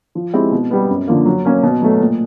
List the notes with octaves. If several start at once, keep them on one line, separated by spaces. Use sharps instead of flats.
F3
G#3 C4 E4 G4
B2
G3 B3
F#2
D3 F3 A#3
F#3
A#3 C#4
B2
F#3 A3
A#2